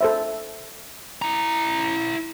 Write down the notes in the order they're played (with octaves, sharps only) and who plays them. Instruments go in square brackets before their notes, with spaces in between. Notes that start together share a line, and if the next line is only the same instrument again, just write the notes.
[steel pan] A4 C5 E5
[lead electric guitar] E4 A#5